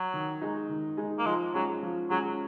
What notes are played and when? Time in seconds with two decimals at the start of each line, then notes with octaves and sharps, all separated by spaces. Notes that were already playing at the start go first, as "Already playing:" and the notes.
Already playing: F#3
0.14 D#3
0.42 G#3 D#4
0.70 D#3
0.97 G#3 D#4
1.19 A#3
1.26 F3 G#3
1.54 F#3 G#3 C#4
1.83 F3
2.10 F#3 G#3 C#4